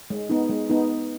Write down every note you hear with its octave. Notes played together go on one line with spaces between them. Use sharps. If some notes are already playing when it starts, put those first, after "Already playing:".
G#3
B3 D#4
G#3
B3 D#4